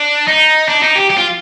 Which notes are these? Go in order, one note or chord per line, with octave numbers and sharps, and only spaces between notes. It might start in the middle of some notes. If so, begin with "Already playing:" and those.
Already playing: D4
D#4
D4
D#4
G4
G4
F4